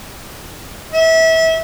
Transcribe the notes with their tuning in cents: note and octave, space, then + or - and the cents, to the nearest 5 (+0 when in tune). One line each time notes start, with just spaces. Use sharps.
E5 -25